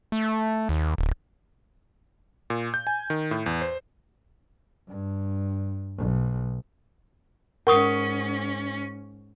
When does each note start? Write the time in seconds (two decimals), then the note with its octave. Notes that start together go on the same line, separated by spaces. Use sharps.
0.12 A3
0.69 D#2
0.98 D1
2.50 A#2
2.74 G6
2.87 G#5
3.10 D#3
3.31 A2
3.46 E2
3.62 C5
4.88 G2
5.98 B1
7.67 G#2 C#4 A#4 F#5 C#6 D#6